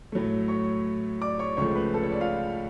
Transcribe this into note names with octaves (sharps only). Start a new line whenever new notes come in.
A2 F#3 A3
C#5 C#6
D5 D6
C#5 C#6
C#2 C#3 F3 A3 C#5 C#6
B4 B5
A4 A5
C#5
D5
F4 F5